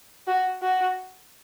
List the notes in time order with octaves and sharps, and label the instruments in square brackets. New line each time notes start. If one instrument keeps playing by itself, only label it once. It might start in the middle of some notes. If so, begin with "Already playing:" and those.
[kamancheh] F#4
F#4